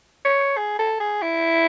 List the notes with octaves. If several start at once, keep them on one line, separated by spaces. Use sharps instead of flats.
C#5
G#4
A4
G#4
E4